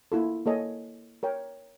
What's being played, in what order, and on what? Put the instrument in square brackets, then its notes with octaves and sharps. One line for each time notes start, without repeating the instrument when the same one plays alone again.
[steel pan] A#3 E4 F4 A4
A#3 A4 C#5 D#5 G#5
A#4 C#5 G5